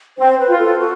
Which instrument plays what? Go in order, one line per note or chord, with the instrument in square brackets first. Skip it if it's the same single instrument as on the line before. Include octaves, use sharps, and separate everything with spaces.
[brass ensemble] C4 [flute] C5
[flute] B4
[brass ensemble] F4
[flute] A4
F#4